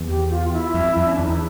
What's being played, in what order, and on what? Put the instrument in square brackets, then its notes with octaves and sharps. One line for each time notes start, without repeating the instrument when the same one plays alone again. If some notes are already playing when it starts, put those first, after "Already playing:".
Already playing: [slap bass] E2
[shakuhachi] G4
F4
E4
[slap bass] F2
F2
[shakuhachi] C#4
[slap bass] E2 [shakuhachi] D4
[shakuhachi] D#4
E4